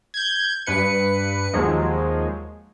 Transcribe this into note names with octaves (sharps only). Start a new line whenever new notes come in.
G6 G#6
G2 B4 C#7
D#2 F3 F#3 G#3